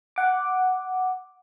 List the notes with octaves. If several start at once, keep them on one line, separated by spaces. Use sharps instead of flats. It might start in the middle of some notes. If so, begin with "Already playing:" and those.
F#5 D6